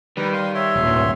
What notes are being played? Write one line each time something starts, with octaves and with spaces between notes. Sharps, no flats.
D#3 G3 B4
F5 C6
C#5 E5 C6
D#1
G2